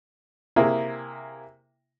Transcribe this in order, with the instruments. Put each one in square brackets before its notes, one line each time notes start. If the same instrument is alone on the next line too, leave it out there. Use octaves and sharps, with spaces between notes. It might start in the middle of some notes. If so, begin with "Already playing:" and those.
[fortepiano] C3 A#3 E4 G#4